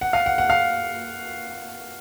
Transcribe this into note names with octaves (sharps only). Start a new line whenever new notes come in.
F#5
F5
F#5
F#5
F5